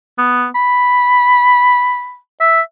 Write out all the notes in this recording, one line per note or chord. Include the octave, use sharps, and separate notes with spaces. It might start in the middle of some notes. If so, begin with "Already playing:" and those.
B3
B5
E5